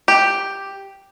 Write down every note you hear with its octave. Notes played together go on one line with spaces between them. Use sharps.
G4